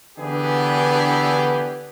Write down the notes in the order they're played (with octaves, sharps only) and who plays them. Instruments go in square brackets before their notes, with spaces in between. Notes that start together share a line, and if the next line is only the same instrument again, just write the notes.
[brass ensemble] D3 E3 B3 D4 G4 G#4